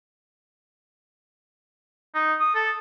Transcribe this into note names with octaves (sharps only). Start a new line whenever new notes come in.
D#4
D#6
A4